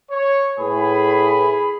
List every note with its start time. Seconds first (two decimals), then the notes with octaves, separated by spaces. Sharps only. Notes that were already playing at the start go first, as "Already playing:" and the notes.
0.11 C#5
0.59 A2 G#4 B4 B5